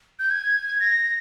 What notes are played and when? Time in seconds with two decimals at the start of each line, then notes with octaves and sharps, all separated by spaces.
0.19 G6
0.30 G#6
0.80 A#6